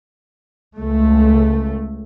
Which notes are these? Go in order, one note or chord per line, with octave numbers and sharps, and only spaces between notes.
C#2 A3